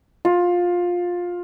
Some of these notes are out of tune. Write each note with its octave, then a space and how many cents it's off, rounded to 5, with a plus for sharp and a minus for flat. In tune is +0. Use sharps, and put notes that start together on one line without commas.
F4 +15